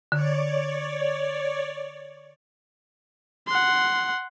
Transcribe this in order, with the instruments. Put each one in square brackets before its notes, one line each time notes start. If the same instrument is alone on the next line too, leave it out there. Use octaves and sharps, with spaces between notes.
[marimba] D3 [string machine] C#5 D5
[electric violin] F#5 C6